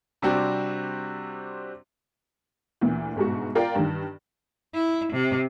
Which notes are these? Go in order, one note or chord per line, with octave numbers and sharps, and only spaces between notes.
C3 G3 C4 D4 F#4 G4
D2 A#2 E3
G1 G#2 B2 F#4
F4 A#4 D5 F5 G5 A#5
G2 D#3
E4
C3